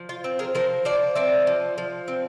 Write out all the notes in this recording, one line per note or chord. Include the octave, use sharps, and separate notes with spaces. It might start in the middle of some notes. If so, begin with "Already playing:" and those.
Already playing: F3
F4
C4
G#4 A#4
F3 A#4 C5
F3 C5 D5
C4 D5 E5
F3
F3
C4